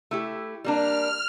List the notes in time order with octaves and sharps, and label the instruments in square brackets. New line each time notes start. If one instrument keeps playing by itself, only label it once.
[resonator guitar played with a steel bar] A3 E4 G4
[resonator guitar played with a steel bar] G3 A#3 D4 [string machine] F6